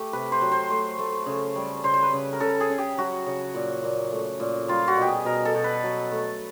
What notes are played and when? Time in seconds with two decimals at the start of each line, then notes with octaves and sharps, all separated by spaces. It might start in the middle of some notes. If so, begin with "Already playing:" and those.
Already playing: A3 G4
0.13 C3 B4
0.32 C5
0.42 F#3
0.52 C5
0.70 A3
0.99 A3
1.26 C#3
1.55 G3
1.83 C#3 C5
1.94 C5
2.03 B4
2.13 C#3
2.33 A#4
2.40 C#3 A4
2.60 G#4
2.70 C#3
2.78 G4
2.98 F#3 F#4
3.26 C#3
3.55 A#2
3.84 A#2
4.12 A3
4.40 A#2
4.68 G3 F4
4.88 F#4
4.97 B2 G4
5.08 G#4
5.25 B2 A#4
5.45 A4
5.54 B2
5.64 B4
5.84 F#3
6.12 A3